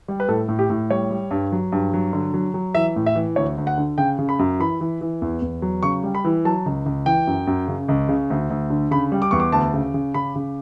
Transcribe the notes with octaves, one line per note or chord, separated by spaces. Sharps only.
G3
B4
A2 A4
A2
G4
A2
G3 C#5
G3
G2
F#3
G2
F#3
D3
F#3
F#3
E3 E5
A2
E5
E3
D2 C#5
D2
F#5
D3
C#3 G5
C#3
B5
F#2
E3 B5
E3
E3
E2
E2
F#3
C#3 C#6
G3
B5
E3
F#3 A5
C#2
C#2
E3 G5
F#2
F#2
C#3
C#2
C#3
D2
D2
D3
C#3 B5
G3
D6
E2 C#6
D6
D2 A5
C#3
C#3
C#3 B5
C#3